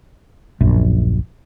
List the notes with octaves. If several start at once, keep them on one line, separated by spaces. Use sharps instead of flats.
D1 A#1 F#2